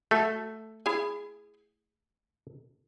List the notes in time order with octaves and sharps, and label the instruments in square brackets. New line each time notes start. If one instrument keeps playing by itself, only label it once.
[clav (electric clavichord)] A3 [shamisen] F#4 A4
[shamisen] E4 G#4